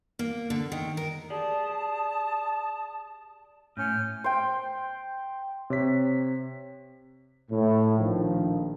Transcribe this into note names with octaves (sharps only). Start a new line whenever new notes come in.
A#3
D3
D#3
A#4
G4 G#4 D5 A5 D#6
A2 C#4 F6 G6
C5 G5
C3 C#5 B6
A2
A#1 D#3 F3